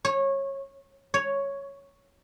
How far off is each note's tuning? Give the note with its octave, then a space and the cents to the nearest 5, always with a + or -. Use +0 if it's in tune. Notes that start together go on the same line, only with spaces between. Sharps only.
C#5 -20
C#5 +0